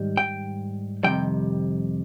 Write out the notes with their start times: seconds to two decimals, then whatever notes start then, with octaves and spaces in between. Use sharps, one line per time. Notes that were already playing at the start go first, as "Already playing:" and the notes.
Already playing: G#2 D#3 G3
0.17 G5
1.04 F2 C3 D#3 G3 G5